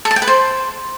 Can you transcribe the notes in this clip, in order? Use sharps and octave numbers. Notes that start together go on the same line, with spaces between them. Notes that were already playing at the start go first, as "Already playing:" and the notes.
A4
A5
G5
B4
C5